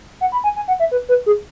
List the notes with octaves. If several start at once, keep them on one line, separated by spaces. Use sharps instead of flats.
F#5
B5
G#5
G#5
F#5
E5
B4
B4
G#4